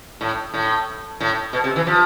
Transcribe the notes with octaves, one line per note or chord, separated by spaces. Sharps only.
A2
A2
A2
B2
C3
E3
F3